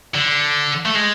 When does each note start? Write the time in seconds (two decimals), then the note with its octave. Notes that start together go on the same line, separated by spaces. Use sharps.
0.15 D3
0.86 A3
0.95 G#3